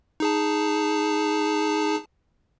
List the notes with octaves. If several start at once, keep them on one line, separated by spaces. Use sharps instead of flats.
D#4 G#4 A5